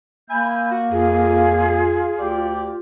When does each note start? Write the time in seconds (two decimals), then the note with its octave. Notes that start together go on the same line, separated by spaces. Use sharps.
0.30 A#3 E5 G#5 B5 G6
0.70 F#4
0.91 F2 F4 G#4
2.18 D2 G4 D5